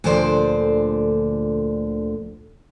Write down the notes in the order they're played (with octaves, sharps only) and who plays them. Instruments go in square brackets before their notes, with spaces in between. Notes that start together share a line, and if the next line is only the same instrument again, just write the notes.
[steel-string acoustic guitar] D2 A#2 D3 F3 C5 D5